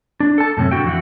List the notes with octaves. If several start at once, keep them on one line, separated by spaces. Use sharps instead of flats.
D4
A4 A5
F#2 A2 C3 C#4
D3 F#4 G5
F2 E3 F#4